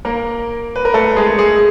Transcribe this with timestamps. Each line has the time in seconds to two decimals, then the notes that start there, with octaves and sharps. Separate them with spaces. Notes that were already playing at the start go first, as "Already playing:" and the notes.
0.05 A#3 A#4
0.76 B4
0.85 A#4
0.94 A3 A4
1.16 G#3 G#4
1.38 G#3 G#4